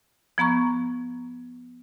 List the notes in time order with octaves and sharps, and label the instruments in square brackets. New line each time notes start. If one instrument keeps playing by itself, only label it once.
[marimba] F3 B3 A#5 C#6